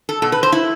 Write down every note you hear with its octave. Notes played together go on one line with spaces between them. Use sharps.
A4
B2 A4
B4
C5
E4